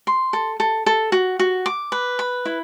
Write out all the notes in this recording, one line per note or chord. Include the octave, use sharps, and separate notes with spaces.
C6
A4
A4
A4
F#4
F#4
D6
B4
B5
E4